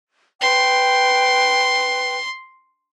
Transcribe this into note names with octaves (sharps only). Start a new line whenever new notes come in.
B4 G5 C6